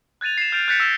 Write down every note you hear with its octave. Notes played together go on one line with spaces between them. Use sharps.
F#6 G#6 A6 D#7 F7
C7 E7
F6 G6 A6 C7 D7 F7
F#6 G6 A6 B6 C#7 D7
E6 A#6 E7